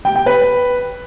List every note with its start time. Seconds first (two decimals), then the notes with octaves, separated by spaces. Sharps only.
0.05 G5
0.16 G5
0.26 B4